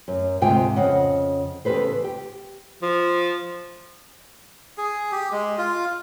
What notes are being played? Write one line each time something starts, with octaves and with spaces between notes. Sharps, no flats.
F#2
D2 G#2 C3 F4 G5 G#5
F2 C#3 D#5 F#5
E2 C#3 G4 A4 B4 C5
G4
F3
G#4
G4
G#3
F4